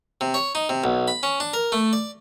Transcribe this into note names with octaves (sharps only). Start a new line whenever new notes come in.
C3
C#5
D#4
C3
B1
B5
C#4
D4
A#4
A3
D5